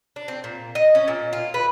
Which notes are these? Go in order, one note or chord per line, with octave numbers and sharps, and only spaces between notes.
D4
C4
A#2
D#5
C#4
A#2
F4
B4